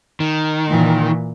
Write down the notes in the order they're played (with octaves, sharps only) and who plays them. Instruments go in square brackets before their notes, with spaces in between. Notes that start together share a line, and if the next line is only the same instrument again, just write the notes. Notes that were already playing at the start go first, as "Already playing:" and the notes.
[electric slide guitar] D#3
[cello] A#2 E3